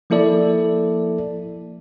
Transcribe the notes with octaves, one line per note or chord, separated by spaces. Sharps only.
F3 A#3 E4 A4 D5